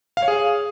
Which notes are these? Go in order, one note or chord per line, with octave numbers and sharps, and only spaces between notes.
F5
C#5
G#4